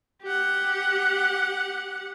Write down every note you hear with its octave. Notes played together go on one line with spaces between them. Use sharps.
G4 F#5